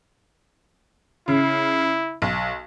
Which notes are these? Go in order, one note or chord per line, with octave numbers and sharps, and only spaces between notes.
C#3 E4
B1